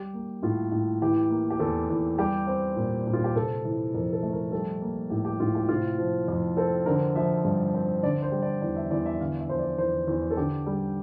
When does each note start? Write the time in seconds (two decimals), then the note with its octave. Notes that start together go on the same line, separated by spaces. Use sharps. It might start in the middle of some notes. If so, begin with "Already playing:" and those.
Already playing: G3 G4
0.13 A#3
0.42 A2 F4
0.72 A2
1.02 E3 G4
1.30 A#3
1.50 G4
1.60 E2 A4
1.90 E2
2.18 G3 G4
2.47 C4
2.76 A#2
3.07 A#2
3.13 F4
3.24 G4
3.35 C3 A4
3.65 E3
3.94 F2 A#4
4.13 A4
4.23 A3
4.33 A#4
4.52 G3 A4
4.81 A#3
5.10 A2 G4
5.25 G4
5.40 A2 F4
5.55 G4
5.69 C3 F4
5.98 F3
6.28 F2
6.57 C4 A4
6.86 D3 A#4
7.16 F3 E5
7.45 G2
7.74 C4
8.03 D3 D5
8.22 C5
8.32 G3
8.42 D5
8.62 E2 D5
8.76 E5
8.91 E2 D5
9.06 E5
9.20 D3 F5
9.40 E5
9.49 F3 C5
9.59 D5
9.78 E2 C5
10.08 E2
10.31 A4
10.37 D3 G4
10.66 G3